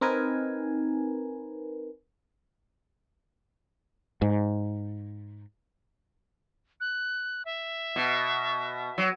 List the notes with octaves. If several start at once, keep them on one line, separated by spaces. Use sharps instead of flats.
C4 D#4 A#4 B4 G#5
G#2
F#6
E5
B2
F#3